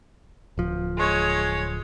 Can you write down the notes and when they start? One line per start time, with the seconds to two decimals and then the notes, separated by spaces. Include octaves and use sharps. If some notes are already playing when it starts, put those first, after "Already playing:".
0.58 D1 F3
0.97 G#3 C#5